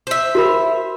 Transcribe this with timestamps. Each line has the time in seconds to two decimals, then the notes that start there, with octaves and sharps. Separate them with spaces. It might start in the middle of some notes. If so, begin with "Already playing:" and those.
0.07 C5 E5
0.35 F#4 A#4 B5